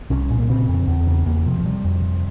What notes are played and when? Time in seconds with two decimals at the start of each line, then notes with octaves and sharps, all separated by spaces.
0.10 C2 C#4
0.30 A#2
0.39 A#3
0.50 C#3 C4
0.68 F2
0.88 E2
1.07 C#3
1.26 E2 A#3
1.46 C3 F3
1.59 F3
1.65 C3 G3
1.84 F2
2.03 C3